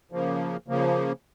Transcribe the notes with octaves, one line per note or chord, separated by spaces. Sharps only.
C#3 F3 A#3
C#3 F3 A#3